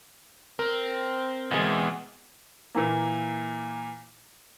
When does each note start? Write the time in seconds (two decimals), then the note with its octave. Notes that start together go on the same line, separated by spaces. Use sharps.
0.59 C4 A#4
1.51 E2 B2 G#3
2.75 A#2 E3 A#3